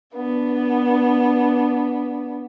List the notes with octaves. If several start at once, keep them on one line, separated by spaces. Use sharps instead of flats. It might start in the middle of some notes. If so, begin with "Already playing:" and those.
B3 D4